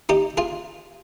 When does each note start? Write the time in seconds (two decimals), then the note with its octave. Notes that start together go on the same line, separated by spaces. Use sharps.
0.09 D#4 G4
0.37 F4 G#4